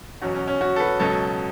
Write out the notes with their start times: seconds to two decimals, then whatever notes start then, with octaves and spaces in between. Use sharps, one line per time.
0.22 E2 B2 F#3 C#4 F#4
0.34 C#4
0.47 C#4
0.61 C#4 F#4
0.76 A4
0.80 F#4 B4
1.00 C#2 B2 F#3 A4 C#5